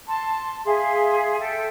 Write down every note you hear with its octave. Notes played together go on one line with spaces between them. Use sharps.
A5 C6
G#4 E5 F5 C6
A4 E5 G5